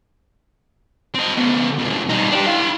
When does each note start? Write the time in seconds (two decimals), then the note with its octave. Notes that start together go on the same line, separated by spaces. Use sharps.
1.15 C4 D#5
1.36 C#3 B3
1.79 F2 B2
2.09 G3 D#4
2.32 D4 G4
2.47 E4 F5